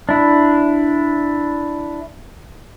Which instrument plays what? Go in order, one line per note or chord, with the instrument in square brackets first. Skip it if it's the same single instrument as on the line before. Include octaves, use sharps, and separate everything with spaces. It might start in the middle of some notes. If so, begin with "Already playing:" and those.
[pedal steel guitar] D4 E4